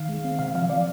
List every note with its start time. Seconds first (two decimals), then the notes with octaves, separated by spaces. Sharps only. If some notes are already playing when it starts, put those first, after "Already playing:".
Already playing: D#3 F5
0.09 G#3
0.24 C4
0.39 C3 F5
0.54 F3 F5
0.70 F3 D5